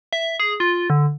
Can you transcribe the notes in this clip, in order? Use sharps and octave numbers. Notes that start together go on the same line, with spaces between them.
E5
G#4
F4
D3